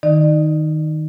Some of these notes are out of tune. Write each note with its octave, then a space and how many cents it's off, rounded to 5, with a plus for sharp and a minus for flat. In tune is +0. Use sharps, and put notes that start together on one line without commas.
D#3 +0 D#4 +0 D5 +40